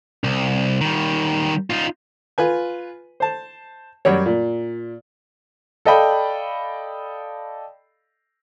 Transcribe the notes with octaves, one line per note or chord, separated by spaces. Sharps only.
C2
D#3 G3
D#4 F4
F4 B4 G#5
C5 A5
F#2 G3 F#4 C#5
A#2
A4 D5 D#5 F5 G5 B5